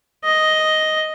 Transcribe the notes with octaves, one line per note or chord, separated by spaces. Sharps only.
D#5